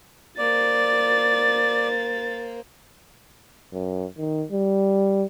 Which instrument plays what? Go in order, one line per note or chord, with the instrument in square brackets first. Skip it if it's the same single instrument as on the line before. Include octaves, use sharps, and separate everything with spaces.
[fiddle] A#3 C5 [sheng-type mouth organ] D5 [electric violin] A6
[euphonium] F#2
D#3
G3